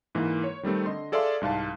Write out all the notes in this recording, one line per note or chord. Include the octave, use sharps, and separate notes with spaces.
G#2 E3 A#3
C#5
D#3 G3 A3 C4
D3 D#5 C6
G#4 A4 D5 E5 F5 C6
C2 G#2 F5 A5